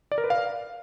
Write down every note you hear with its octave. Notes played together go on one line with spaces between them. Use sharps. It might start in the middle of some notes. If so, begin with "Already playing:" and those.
D5
A#4
B4
F5